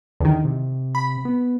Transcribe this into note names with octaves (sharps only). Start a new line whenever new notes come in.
E2 D3 D#3
C3
B5
B3